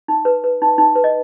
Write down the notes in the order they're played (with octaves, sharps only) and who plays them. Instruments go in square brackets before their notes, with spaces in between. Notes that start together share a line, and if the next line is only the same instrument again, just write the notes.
[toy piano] D#4
B4
B4
D#4
D#4
B4
D#5